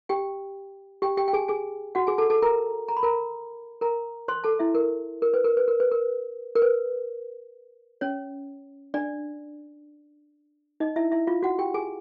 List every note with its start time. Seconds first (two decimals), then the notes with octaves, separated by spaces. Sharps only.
0.09 G4 G5
1.02 G4 G5
1.17 G4 G5
1.28 G5
1.33 G#4 G#5
1.48 G#4 G#5
1.95 F#4 F#5
2.07 G#4 G#5
2.18 A4 A5
2.30 A4 A5
2.42 A#4 A#5
2.88 A#5
2.97 B5
3.03 A#4 A#5
3.81 A#4 A#5
4.28 C5 C6
4.44 A4 A5
4.59 E4 E5
4.75 A#4
5.22 A#4
5.34 B4
5.44 A#4
5.57 B4
5.68 A#4
5.80 B4
5.91 A#4
6.55 A#4
6.62 B4
8.01 C#4 C#5
8.94 D4 D5
10.80 D#4 D#5
10.96 E4 E5
11.12 E4 E5
11.27 F4 F5
11.42 F#4 F#5
11.58 G4 G5
11.74 G#4 G#5